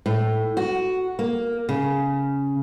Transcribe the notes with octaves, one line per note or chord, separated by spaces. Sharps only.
A2
F#4
A#3
C#3